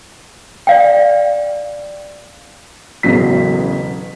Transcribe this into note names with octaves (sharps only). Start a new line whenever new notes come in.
D5 F5 G5
E1 A1 C#3 F#3 B6